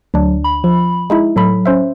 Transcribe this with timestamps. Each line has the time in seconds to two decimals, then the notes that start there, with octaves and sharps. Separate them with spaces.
0.14 D2 F#3 D4
0.44 B5
0.64 F3
1.10 G#3 D#4 E4
1.36 A2 F#3 A4 B5
1.66 C#4 C5 E5